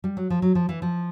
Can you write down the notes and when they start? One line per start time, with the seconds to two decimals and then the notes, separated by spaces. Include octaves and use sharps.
0.04 G3
0.17 F#3
0.30 F3
0.42 F#3
0.55 F3
0.69 E3
0.82 F3